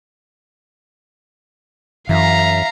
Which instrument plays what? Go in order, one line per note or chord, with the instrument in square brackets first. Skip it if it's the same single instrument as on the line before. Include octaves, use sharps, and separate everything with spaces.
[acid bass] F#2 [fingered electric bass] E3 [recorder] E5 [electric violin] F5 A#5